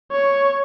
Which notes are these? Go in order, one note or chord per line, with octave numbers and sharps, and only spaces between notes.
C#5